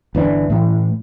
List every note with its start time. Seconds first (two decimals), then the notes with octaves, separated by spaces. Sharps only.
0.15 G1 E3 D4
0.50 A2 E3